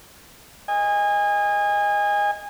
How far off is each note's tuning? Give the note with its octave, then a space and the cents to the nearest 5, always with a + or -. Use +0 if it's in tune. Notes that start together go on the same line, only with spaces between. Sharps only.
D#5 +0 G#5 -25